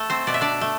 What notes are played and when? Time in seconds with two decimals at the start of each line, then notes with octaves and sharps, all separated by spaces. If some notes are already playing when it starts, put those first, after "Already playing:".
Already playing: A3 A4
0.10 C4 C5
0.27 B2 D5
0.34 E5
0.41 D4 D5
0.61 A3